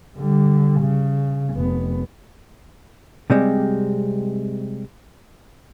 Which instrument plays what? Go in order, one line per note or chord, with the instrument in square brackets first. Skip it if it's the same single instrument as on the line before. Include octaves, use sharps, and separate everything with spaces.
[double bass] D3 G3
C#3
F1 B3
[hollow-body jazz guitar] C3 G3 G#3 C4